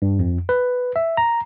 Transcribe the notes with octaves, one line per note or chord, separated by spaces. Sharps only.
G2
F2
B4
E5
A#5